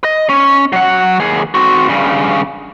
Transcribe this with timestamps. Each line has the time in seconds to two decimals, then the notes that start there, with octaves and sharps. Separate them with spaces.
0.04 D#5
0.29 C#4
0.73 F#3 F#5
1.20 D#2 G#4
1.54 C4 F#4
1.88 G2 C#3